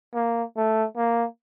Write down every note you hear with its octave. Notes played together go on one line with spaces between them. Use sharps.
A#3
A3
A#3